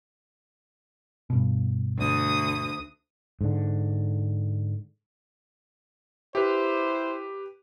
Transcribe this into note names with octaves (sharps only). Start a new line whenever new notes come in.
G2 B2
D2 D#6
G#2 D3
E4 G4 B4 C5